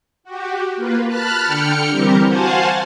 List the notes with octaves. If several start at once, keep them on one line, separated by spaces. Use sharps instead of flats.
F#4 G4
A#3 F4 B4
A5 B5 F6 F#6 A6
D3 G5 F6 C#7
E3 G3 C4 G4 A#4
F#4 C5 F5 F#5 G#5 A5